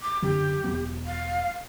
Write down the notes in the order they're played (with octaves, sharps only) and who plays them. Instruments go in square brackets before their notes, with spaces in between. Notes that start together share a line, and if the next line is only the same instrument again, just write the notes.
[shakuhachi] D6
[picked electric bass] F#1 D3 F#3 [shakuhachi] G4
[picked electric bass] E1 F#3 B3
[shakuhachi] F5